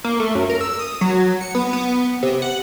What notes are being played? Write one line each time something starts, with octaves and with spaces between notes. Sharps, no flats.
A#3
A3
F#2
A#4
E6
D#6
F#3
C#7
B3
B3
C3
F#5